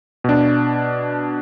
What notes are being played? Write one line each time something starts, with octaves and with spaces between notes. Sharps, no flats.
B2 D4